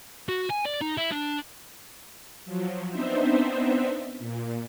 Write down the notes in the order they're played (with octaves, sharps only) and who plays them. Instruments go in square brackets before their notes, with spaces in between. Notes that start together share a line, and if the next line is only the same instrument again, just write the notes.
[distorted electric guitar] F#4
G#5
D5
D#4
E4
D4
[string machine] F3 F#3
B3 C4 D4 D#4 C5 E5
A#2